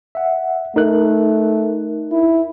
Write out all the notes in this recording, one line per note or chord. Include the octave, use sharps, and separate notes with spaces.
E5 F#5
A3 D#4 A#4 F#6
E4